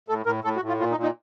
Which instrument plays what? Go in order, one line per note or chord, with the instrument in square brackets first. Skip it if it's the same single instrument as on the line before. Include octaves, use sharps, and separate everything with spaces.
[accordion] A2 A4
A2 A#4
A2 A4
F#4
A2
F4
A#2 F4
D#4
A#2
D#4